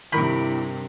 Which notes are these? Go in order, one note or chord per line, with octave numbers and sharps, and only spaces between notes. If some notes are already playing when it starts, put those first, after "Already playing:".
G2 C3 D#3 E4 A#4 B5